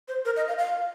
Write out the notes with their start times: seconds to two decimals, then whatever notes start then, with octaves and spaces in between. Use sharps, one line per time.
0.08 C5
0.25 A#4
0.36 D#5
0.48 F5
0.59 F5